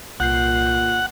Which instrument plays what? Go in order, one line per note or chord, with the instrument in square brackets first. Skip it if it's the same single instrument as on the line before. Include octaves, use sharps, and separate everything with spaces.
[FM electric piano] C2 G6 C7 [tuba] A#2 [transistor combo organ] F#5